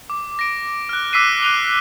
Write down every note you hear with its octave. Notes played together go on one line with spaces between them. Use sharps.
D6
A#6 D7
F6 F#6
D6 E6 B6 C7 D#7
F#6 D#7 F7 G7